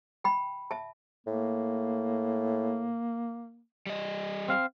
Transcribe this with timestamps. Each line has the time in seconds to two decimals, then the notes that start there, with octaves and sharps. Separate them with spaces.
0.24 G5 B5
0.71 E5 A5
1.27 A2 A#3
3.87 G3 D#5
4.48 C4 F5